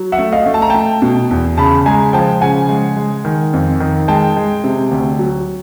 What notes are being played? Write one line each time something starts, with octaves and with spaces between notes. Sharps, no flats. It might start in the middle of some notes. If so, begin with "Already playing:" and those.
Already playing: F#3
E5 F#5
A3
D#5 F5
A3
A5
A#5
A3 G5 A5
B2
E2
C#3 A5 B5
G#3 G#5 A#5
F3 G5 A5
C#3 F#5 G#5
G#3
G#3
D#3
F2
D#3
G#3 G5 A5
G#3
C3
D2
F#3